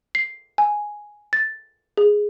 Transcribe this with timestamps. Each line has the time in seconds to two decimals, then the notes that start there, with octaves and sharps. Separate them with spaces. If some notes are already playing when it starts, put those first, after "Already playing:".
0.15 C7
0.58 G#5
1.33 A6
1.97 G#4